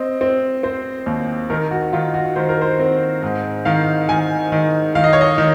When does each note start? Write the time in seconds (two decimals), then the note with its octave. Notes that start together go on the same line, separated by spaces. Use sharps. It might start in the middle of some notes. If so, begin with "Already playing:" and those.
Already playing: C4 D#5
0.21 C4
0.63 C4 C5
1.06 D#2
1.50 D#3 A#4
1.71 F#4
1.93 D#3 F4
2.14 F#4
2.36 D#3 C5
2.49 A#4
2.61 C5
2.80 C4
3.22 G#2
3.65 D#3 F5
4.09 D#3 G#5
4.52 D#3
4.95 D#3 F5
5.04 D#5
5.13 C#5
5.21 D#5
5.38 D#3